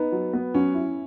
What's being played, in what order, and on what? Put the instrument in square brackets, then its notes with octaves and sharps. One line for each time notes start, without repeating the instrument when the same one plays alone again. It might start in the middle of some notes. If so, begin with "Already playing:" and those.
Already playing: [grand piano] B3 [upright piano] D#4
[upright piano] F#3
B3
[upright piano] F#3 [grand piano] C#4
[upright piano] E4